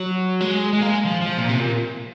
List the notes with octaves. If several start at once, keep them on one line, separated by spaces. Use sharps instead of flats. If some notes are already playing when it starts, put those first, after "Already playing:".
Already playing: F#3
G#3
G#3
A#3
G#3
F3
F3
A#2
C3
A#2